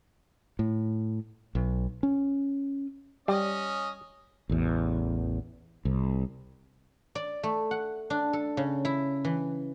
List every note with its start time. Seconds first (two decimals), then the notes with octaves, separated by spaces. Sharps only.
0.59 A2
1.55 B1
2.03 C#4
3.28 G3 C#4 D#5
4.49 A1 E2
5.85 C2
7.15 D5
7.43 A3
7.71 F#5
8.10 D4
8.33 A4
8.57 C#3
8.85 E4
9.25 E3